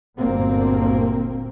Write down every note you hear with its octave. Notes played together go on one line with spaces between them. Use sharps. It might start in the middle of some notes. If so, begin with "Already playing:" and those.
G1 D2 A#2 A#3 C4